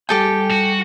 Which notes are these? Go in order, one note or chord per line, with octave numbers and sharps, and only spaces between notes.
G3 G4 A4 G5 G#5
F#4